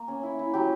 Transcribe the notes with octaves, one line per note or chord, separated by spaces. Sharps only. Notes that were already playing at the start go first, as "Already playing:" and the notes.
Already playing: A#3
C#4
E4
E4
F#3 G4